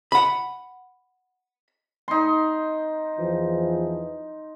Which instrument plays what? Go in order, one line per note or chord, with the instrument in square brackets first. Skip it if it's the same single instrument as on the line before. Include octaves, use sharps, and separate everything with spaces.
[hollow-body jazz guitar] F#5 B5
[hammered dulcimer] D#4 C6
[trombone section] E2 E3 F3